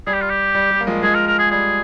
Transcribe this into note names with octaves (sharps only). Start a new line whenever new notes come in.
G3 G#4
G4
F4
G4
G3
G3
A#3
F3 G#3
F3 G#3 G#4
A#4
A#4
G#4
G3 G#4